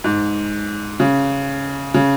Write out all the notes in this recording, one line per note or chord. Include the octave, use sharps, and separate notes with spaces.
G#2
C#3
C#3